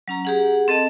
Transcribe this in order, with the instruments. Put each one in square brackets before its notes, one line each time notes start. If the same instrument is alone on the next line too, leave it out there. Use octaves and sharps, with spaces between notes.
[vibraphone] F#3 C#4 A#5
G4 G#4 F#5
C4 A4 D#5 A5